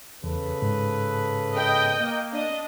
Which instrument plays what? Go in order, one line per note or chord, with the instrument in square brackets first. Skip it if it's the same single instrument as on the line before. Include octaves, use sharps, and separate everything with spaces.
[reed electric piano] E2 [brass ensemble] C#3 A4 B4
[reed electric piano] G#2
[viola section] D#5 G5
[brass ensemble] A#3
[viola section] D4 D#5